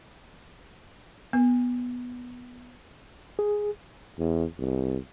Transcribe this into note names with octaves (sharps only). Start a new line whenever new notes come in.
B3
G#4
E2
C2